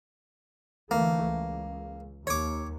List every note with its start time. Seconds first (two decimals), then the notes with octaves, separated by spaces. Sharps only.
0.91 D2 E3 A3 A#3
1.25 C#2
2.27 D#2 C#5 D6